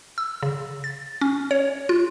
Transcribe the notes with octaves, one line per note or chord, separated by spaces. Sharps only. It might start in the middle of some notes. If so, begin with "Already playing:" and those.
E6
C#3
A6
C#4
C#5
F4